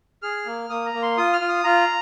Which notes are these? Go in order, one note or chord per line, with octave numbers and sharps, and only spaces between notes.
G#4 F6
A#3
A#3 D#6
A#5
A#3
C6
F4 D#6
F6
F4
D#6
F4 A#5